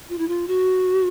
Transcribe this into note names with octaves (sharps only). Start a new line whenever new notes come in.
F4
E4
F4
F#4